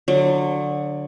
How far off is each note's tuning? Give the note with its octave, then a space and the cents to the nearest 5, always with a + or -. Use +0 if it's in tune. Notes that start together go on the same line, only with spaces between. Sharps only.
D3 +0 F#3 -20